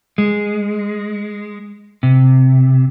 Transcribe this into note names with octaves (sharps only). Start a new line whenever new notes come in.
G#3
C3